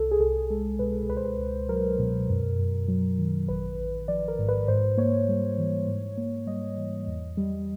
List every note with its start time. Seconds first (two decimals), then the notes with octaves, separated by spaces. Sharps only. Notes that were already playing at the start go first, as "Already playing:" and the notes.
Already playing: C2 A4
0.11 G#4
0.20 C2 A4
0.50 G#3 A4
0.79 B2 B4
1.09 C#2 B4
1.17 C5
1.25 B4
1.39 C#2
1.69 F#3 A#4
1.99 B2
2.29 F#2
2.59 F#2
2.88 F#3
3.19 D#3
3.48 A1 B4
3.79 A1
4.08 F3 D5
4.28 A#4
4.39 G#2
4.49 B4
4.68 G#2 C5
4.98 A#3 C#5
5.28 G3
5.58 E3
5.87 G#2
6.18 A#3
6.47 G3 D#5
6.78 E3
7.07 E2
7.37 G3